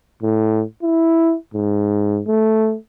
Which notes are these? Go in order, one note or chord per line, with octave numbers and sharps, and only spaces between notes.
A2
E4
G#2
A3